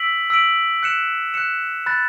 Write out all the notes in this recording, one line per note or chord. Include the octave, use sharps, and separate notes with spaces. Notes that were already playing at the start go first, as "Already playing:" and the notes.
Already playing: E6 B6 D7 F#7
E6 B6 D7 F#7
F#6 C#7 E7
F#6 C#7 E7
B5 F#6 A6